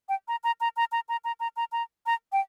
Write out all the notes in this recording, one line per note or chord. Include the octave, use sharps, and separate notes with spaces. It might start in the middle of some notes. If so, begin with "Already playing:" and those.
G5
A#5
A#5
A#5
A#5
A#5
A#5
A#5
A#5
A#5
A#5
A#5
G5